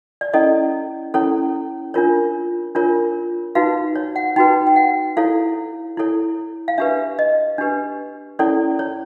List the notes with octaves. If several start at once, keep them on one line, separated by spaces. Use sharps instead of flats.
D5
C#4 E4 A4 C#5 D#5
C#4 E4 A4 C#5
D4 F4 A#4 C#5
D4 F4 A#4 C#5
D#4 F#4 B4 F5
C#5
F#5
D#4 F#4 B4 G5
G5
F#5
E4 A4 C#5 F5
E4 A4 C#5
F5
D4 G4 B4 E5
D#5
D4 G4 B4
C#4 E4 A4 C#5 D5
C#5